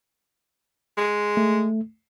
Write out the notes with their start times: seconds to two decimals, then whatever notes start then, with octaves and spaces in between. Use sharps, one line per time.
0.97 G#3
1.37 A3